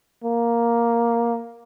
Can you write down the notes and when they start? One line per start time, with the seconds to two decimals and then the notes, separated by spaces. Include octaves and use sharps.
0.24 A#3